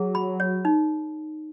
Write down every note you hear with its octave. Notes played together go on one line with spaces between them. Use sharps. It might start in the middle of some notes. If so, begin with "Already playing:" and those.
Already playing: F#3 G#4
B5
C#5
D#4